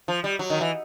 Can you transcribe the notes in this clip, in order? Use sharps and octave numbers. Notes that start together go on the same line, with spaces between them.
F3
G3
F#3
D#3
E3